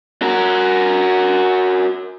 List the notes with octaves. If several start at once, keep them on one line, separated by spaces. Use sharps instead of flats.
F#4 A#4